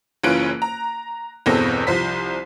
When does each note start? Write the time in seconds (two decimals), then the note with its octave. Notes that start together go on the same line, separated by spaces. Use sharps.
0.24 F#1 E3 C#4 F4 F#6 D7
0.62 A#5
1.46 G1 E2 B2 C4 A4 A#6
1.87 C2 F3 C5 C6 B6